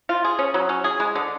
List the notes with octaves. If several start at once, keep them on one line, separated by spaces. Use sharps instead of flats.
F4
G#4
C#4
F#3
C#4
G#4
G#3
D3